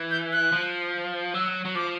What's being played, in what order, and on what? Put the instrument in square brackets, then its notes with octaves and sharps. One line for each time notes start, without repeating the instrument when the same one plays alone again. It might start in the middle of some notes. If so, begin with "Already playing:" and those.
Already playing: [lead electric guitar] E3
[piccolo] G6
F#6
[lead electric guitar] F3
[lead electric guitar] F#3 [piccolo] E6
[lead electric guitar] F#3
[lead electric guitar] F3 [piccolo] D6